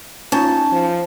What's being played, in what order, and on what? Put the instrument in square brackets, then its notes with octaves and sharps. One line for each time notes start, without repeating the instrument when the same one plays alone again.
[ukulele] C#4 D#4 [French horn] F4 [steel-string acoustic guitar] A5
[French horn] F3